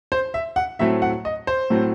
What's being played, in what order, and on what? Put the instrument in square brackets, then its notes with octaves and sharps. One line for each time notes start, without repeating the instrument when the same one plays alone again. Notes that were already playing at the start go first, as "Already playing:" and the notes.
[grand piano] C5
E5
F#5
A2 F#3 A3 C4 E5
F#5
D#5
C5
A2 F#3 A3 C4